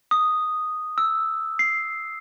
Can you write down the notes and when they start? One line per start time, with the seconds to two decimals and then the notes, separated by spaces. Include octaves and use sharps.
0.11 D#6
0.98 E6
1.59 C7